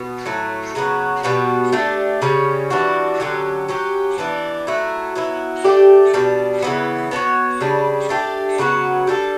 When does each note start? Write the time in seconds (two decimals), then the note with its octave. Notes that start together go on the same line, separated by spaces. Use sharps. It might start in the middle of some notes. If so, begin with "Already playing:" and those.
Already playing: B2 B3
0.26 A2 F#3 A3
0.75 C#3 F#3 B3 F#4
1.23 B2 G3 B3 F#4
1.72 A3 D4 G4
2.22 C#3 G3 C#4
2.70 E3 G3 D4 F#4
3.20 D3 F#3 C#4 G4
3.69 F#3 C#4 G4
4.18 E3 B3 D4
4.67 F#3 A3 E4
5.15 F#3 B3 E4
5.64 A3 D4 G4
6.13 B2 G3 D4
6.62 C#3 E3 B3
7.11 B3 D4 F#4 C#5
7.60 C#3 G3 D4
8.09 A3 D4 G4
8.58 C#3 F#3 B3 F#4
9.07 G3 D4 F#4 A4